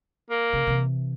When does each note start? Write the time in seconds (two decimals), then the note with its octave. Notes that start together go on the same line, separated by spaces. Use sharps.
0.30 A#3
0.53 C#3
0.67 C3 E3